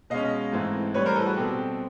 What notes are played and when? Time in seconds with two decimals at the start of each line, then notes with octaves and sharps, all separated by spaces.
0.10 B2 G#3 C#4 D#5 F5
0.52 G#2 E3 A3 C4
0.94 A2 E3 G3 B4 C#5
1.06 A#4 C5
1.15 A4 B4
1.26 F#4 G#4
1.36 B2 G3 C4 G4 A4